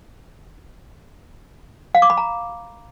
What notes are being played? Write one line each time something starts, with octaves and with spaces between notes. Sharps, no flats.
F5
D6
B5
A#5